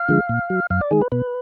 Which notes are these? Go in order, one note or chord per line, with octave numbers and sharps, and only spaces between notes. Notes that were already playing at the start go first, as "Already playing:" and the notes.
Already playing: F5
D3 F3 G#3
A#2
F#3
F#2 F5
D5
D#3 G#3 G#4
B4
B2 B4